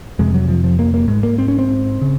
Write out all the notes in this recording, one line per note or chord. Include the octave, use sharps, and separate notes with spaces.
F2 C3 G#3
F#3
F3
F3
A#3
A#3
G#2 G#3
A#3
C4
C#4
C4
C#3